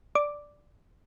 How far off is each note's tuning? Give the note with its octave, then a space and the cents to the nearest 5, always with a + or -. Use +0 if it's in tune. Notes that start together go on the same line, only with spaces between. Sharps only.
D5 +0 D6 +0